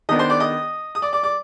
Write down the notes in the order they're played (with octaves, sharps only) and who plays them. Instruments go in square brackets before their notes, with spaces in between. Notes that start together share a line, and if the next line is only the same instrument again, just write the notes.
[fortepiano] D#3 B3 D4 D#5 D#6
C5 C6
D5 D6
D#5 D#6
D#6
D5 D6
D5 D6
D5 D6